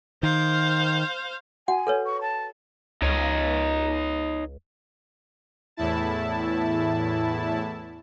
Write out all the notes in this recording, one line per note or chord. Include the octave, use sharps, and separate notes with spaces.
D#3 C5 F5
F#4 F#5 G#5
A4 B4 C#5
C#6
A5
C#2 D#4 C#5 D#5
E2 A2 E4 A5